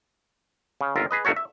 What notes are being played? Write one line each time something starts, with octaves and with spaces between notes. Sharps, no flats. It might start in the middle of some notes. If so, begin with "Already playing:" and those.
C#3
G1 D#2 F4 A#4 E5
G#4 B4 D#5
G1 D#2 D#3 A3 F#4 C#5
E5